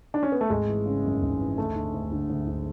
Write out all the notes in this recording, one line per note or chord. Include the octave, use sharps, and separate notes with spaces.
D4
C#4
B3
A3
G#1 G#3
E3
C#3
F#2
G#1
E3
D2 A3
D3
D2
D3
D2
D3